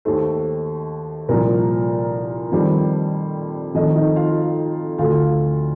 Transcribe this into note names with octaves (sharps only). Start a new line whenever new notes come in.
D#2 D#3 A3 C5
C2 A#2 F3 A#4
F2 D#3 G3 C5
F2 D#3 A3 D#4 D#5
D#4 D#5
F4 F5
D2 D3 A3 F4 F5